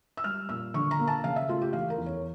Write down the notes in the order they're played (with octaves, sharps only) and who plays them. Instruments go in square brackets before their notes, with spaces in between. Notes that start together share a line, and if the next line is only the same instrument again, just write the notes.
[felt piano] E6
G3 F6
A#2 E6
D3 C#6
A#5
A#3
A5
C#3 F5
E5
A3 F4
G4
E3 F5
A#4
E2
C#5